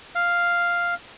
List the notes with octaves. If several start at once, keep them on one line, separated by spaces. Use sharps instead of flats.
F5